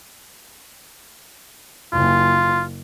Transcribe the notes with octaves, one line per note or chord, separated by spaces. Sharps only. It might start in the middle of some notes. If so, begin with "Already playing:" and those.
F#1 F4